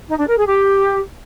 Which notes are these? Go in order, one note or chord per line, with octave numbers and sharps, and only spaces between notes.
D#4
D4
A#4
G#4
G4